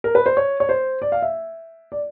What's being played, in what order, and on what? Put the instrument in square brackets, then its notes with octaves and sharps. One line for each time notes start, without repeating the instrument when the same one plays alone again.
[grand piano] A#4
B4
C5
C#5
C#5
C5
D5
F5
E5
D5